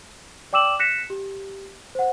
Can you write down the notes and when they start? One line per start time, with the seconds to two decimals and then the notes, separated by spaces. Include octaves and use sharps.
0.53 D5 G5 D6 E6 E7 F#7
0.79 F#6 A#6 B6 C#7 E7
1.10 G4
1.95 C5 F#5